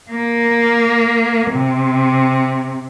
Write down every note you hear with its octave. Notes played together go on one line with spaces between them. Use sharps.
A#3
C3